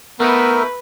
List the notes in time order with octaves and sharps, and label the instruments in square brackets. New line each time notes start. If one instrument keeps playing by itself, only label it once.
[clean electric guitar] A3 D#4 E4 [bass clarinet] B3 [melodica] A#4 [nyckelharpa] B4